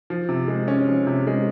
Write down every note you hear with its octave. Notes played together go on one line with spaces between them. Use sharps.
F3
C3
G#3
C#4
F3
C3
G#3